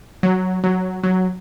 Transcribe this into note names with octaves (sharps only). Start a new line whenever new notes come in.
F#3
F#3
F#3